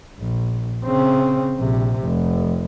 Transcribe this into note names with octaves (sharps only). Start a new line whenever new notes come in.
A#1
C#3 C4
A#1 C3
F1